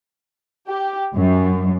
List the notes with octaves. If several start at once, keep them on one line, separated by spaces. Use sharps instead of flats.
G4
F#2